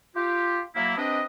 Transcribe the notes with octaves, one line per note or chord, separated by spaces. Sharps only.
F4 G4
F#3 A#3 E4
C3 C4 D4 B4 D#5